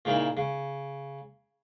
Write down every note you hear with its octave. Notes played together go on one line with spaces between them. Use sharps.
A#2 C#3 D#4 E4 A#4
C#3